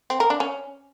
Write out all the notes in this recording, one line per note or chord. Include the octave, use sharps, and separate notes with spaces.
C4
A#4
D4
C#4